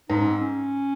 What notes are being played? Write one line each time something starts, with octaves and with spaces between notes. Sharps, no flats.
G#2 D#4
C#4
C4
C#4